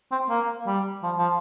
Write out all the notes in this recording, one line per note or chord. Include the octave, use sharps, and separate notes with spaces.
C4
A#3
G3
F3
F3